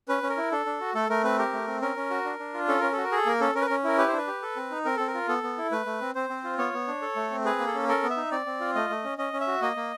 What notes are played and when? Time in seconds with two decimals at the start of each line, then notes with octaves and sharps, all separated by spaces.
0.08 C#4 B4
0.23 C#4
0.29 A#4
0.37 E4
0.52 D4 A4
0.66 D4
0.80 F#4
0.95 A3 A4
1.09 A3 A#4
1.24 C4 B4
1.38 G4 A#4
1.53 A3
1.67 C4
1.81 C#4 A#4
1.96 C#4
2.10 F#4
2.25 D4
2.39 D4
2.54 F4
2.68 C#4 A4
2.80 C#4 A#4
2.92 F#4 A4
3.04 A#4
3.12 G#4 A4
3.26 A#3 A#4
3.40 C#4 A4
3.55 C#4 A#4
3.61 B4
3.66 C#4 A#4
3.84 E4 A#4
3.98 G4 B4
4.08 C5
4.13 D4 B4
4.27 G4
4.42 A4
4.56 C4
4.71 D#4
4.85 C4 A#4
4.96 C4 A4
5.07 A#4
5.14 F4
5.28 B3 A4
5.43 B3
5.58 E4
5.71 A3 B4
5.86 A3
6.01 C4
6.15 C4 C5
6.29 C4
6.44 F4
6.58 B3 C#5
6.73 B3
6.88 D4
7.02 A4
7.16 A3
7.31 C4
7.45 G#4 B4
7.59 A#3
7.67 A4
7.74 C#4
7.88 A4 A#4
8.03 B3
8.10 E5
8.17 D#4
8.31 C4 D5
8.46 C4
8.60 F4
8.75 A3 D#5
8.90 A3
9.04 C#4
9.18 C#4 D#5
9.33 C#4
9.40 E5
9.47 F#4
9.62 A#3 D#5
9.76 A#3